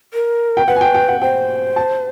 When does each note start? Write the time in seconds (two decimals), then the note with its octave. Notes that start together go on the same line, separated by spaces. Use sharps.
0.14 A#4
0.57 G5
0.68 B4 F#5
0.76 G#5
0.81 G5
0.95 G5
1.08 F#5
1.21 C5 G5
1.76 A5